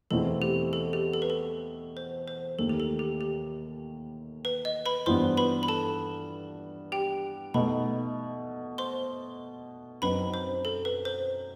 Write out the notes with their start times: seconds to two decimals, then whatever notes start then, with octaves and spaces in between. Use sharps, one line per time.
0.11 E2 B2 A3 C4 E4 A4
0.42 G4
0.73 A4
0.93 G4
1.14 A4
1.22 B4
1.30 A4
1.97 C5
2.28 C5
2.59 D#2 D#3 A3 A4
2.69 G4
2.80 A4
2.99 G4
3.21 G4
4.45 B4
4.65 D#5
4.86 B4 B5
5.06 G2 E3 B3 C5 C6
5.37 B4 B5
5.63 B5
5.68 A4 A5
6.92 G4 G5
7.54 B2 A3 D#4 B4 B5
8.78 C5 C6
10.02 F#2 F#3 C4 D#4 B4 B5
10.34 C5
10.65 A4
10.85 B4
11.05 C5